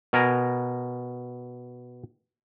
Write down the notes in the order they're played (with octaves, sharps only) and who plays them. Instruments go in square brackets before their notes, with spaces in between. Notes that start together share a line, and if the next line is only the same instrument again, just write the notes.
[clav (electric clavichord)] B2 A#4 G#5 A#5